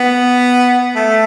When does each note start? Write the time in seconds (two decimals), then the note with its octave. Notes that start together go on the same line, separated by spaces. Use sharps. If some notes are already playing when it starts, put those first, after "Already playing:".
Already playing: B3
0.96 A3